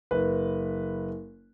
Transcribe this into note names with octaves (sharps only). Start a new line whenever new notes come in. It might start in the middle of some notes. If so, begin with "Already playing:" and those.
F#1 B4